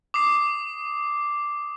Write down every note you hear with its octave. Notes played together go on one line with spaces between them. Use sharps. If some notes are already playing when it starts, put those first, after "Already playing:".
D6 D#6 C7